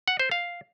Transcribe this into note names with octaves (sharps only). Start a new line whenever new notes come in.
F#5
C5
F5